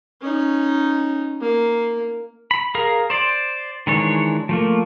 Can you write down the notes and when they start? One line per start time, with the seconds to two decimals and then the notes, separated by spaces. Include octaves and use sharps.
0.22 C#4 D#4
1.41 A#3
2.51 B5
2.75 G#4 A#4 F5
3.10 C5 D5
3.87 D#3 E3 G#3 D4 C#5
4.49 F3 A3 A#3